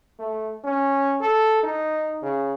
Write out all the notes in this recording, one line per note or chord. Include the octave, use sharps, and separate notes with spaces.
A3
C#4
A4
D#4
C#3